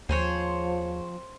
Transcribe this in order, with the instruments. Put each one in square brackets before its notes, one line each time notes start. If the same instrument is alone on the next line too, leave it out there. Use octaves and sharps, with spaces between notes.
[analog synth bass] D#2 [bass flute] F3 [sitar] C4 [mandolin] G#4 C5 C#5